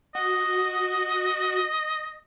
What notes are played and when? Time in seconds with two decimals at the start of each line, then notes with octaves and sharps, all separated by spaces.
0.15 F#4 D#5